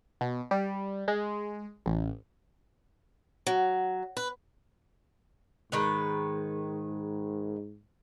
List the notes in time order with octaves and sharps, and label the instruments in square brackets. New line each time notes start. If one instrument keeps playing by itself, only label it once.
[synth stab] B2
G3
G#3
A1
[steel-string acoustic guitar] F#3
B4
[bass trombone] G#2 [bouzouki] D#3 G#3 B4